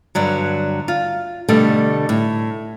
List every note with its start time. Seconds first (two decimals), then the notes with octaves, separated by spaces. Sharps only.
0.15 G2 D3 F#3
0.88 F4
1.49 B2 D3 G3 A3
2.09 A2